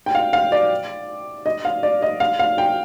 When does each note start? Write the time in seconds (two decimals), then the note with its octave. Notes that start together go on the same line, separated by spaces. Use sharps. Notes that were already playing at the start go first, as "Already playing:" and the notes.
0.06 G5
0.15 F5
0.33 F5
0.52 D5
1.46 D#5
1.65 F5
1.83 D5
2.02 D#5
2.20 F5
2.39 F5
2.58 G5